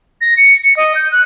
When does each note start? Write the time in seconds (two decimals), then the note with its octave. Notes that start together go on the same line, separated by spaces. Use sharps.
0.21 A#6
0.37 C#7
0.64 C#7
0.77 D#5
0.95 G6
1.12 F#6